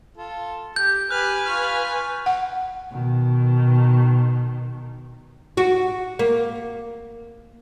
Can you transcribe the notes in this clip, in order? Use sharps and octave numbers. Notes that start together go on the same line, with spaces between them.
F4 A4
G4 G6
G4 B4 G#5 F6 F#6
F4 C#6 F6
F#5
B2 D#3
F#4
A#3